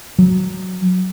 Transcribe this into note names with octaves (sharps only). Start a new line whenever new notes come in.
F#3